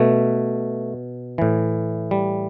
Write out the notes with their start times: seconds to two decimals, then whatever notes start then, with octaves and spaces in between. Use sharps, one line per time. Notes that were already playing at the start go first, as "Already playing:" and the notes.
Already playing: B2 A3
1.38 A2 E3
2.11 G3